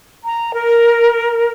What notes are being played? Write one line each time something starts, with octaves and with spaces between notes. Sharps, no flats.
A#5
A#4